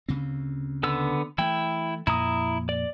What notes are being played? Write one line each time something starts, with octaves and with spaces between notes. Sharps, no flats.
D2 C#3 C4
D3 B3 E6
E3 A3 E4 G5
F2 A#2 E4 A#5 D#6
D5